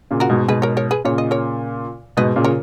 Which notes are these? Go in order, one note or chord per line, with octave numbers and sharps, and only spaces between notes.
A#2 C#3
F#4 A#4
G#2 B2
G#2 B2 G#4 B4
A#4 C#5
A#4 C#5
G#4 B4
A#2 C#3 C#5
D#5
A#4 C#5
G#2 B2 B4 D#5
A#2 C#3
A#4 C#5